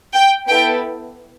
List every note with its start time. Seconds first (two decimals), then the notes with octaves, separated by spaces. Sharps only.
0.14 G5
0.47 B3 E4 A4 G5